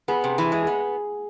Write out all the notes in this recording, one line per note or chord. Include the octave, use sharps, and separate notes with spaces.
B3 G#4
C3
E3
G#3 G#4
G#4
B3